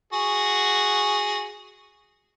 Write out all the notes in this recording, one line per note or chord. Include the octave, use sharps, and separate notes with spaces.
F#4 G#4